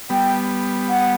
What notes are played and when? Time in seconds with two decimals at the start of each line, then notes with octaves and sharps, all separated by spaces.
0.10 G3 B3 G5
0.89 F#5